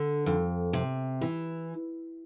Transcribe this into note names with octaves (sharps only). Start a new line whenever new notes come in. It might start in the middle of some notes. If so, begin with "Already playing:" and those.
Already playing: D3
F2
C3
E3